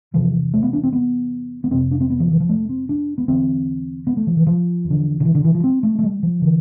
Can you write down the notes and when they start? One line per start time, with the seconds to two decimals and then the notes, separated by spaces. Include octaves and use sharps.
0.14 E2 C3 F3
0.54 A3
0.63 B3
0.73 D4
0.84 C4
0.93 B3
1.64 B3
1.71 F2 C3 C4
1.91 D4
2.01 C4
2.10 B3
2.20 F3
2.31 E3
2.40 F3
2.49 A3
2.69 C4
2.89 D4
3.18 B3
3.28 E2 D3 C4
4.07 B3
4.17 A3
4.27 F3
4.37 E3
4.47 F3
4.85 E2
4.90 D3
5.20 D3
5.25 E3
5.35 D3
5.45 E3
5.55 F3
5.64 C4
5.83 A3
5.99 A3
6.03 G3
6.23 F3
6.42 D3 E3